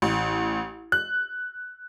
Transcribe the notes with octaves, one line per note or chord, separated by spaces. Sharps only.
A1
F#6